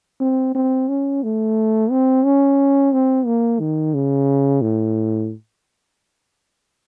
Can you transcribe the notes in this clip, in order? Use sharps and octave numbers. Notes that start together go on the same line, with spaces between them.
C4
C4
C#4
A3
C4
C#4
C4
A#3
D#3
C#3
A2